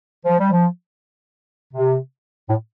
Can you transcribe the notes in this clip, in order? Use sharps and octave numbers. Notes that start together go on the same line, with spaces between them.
F3
G3
F3
C3
A2